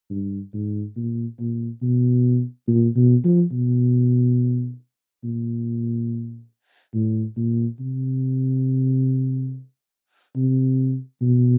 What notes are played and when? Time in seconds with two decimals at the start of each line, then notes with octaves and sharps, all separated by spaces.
0.10 G2
0.54 G#2
0.96 A#2
1.39 A#2
1.82 B2
2.67 A#2
2.95 B2
3.24 F3
3.52 B2
5.24 A#2
6.94 A2
7.37 A#2
7.80 C3
10.36 C3
11.21 B2